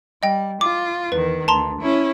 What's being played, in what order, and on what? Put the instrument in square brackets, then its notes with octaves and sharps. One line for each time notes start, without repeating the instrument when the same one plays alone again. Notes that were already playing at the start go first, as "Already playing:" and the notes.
[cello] G3 [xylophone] D#5 G5
[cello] F4 [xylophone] D6
[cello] E2 D#3 [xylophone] B4
[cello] D2 [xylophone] A5 A#5 C6
[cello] C#4 E4